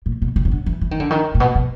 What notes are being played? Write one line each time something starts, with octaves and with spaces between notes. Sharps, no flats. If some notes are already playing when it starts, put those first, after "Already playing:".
A#2
B2
C3
C#3
D3
E3
E3
D#3
D3
D#3
A#2
B2
B2